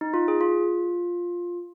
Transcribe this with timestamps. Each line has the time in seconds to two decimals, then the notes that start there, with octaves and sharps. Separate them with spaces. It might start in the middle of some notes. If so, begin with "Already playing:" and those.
0.01 D#4
0.14 F4
0.28 G#4
0.41 F4